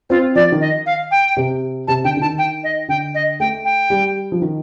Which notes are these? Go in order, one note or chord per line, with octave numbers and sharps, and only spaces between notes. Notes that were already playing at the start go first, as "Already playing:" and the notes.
C4 F4
F3 D5
D#3
D#5
F5
G5
C3
C3 A5
D3 G5
D3
D#3 A5
G5
D#5
D3 G5
D#5
A3 G5
G5
G3
F3
D#3